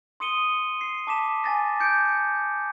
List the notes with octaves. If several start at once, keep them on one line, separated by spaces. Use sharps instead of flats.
C6 D#6 C#7 D#7 G7
C7
A5 D6 B6 E7
G#5 A6 A#6
D6 G6 C#7 D7